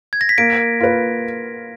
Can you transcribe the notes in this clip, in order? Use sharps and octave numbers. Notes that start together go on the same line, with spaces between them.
G#6
A#6
B6
A#3 D7
F4 B4